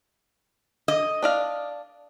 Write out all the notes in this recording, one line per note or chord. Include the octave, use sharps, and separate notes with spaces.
D#5
D4 D5 F5